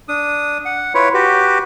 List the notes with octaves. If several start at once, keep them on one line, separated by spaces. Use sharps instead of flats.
D4 D#6
F#5
E4 F4 B4 C#5
F#4 G4 B4